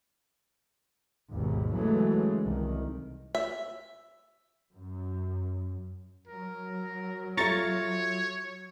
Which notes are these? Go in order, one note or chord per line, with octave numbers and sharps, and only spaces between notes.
G#1 D#2 B2
C#3 E3 F#3 G#3 A3
C2 D#3
E5
F#2
F#3 A#4
F4 A4 C#5 E5 A#5 C#6 A6